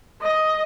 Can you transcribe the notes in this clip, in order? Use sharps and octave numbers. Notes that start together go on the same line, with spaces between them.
D#5